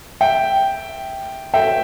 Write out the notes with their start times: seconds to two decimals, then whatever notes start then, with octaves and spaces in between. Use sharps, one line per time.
0.21 E5 G5
1.54 E5 G5